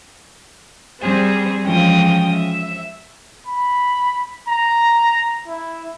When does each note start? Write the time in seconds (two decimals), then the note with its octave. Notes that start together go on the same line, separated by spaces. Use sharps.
1.02 G3 C4 G#4 C5
1.62 E3 F3 G#3 C#4 G5 D#6
2.34 E5
3.47 B5
4.48 A#5
5.47 E4